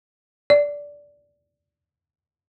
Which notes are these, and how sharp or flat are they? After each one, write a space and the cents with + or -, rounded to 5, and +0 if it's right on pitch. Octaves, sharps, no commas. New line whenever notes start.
D5 -10